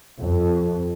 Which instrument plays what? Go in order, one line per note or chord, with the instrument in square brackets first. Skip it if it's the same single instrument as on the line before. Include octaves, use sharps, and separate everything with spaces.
[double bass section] F2